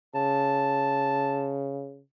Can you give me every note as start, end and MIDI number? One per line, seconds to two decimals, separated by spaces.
0.15 2.01 49
0.15 1.56 81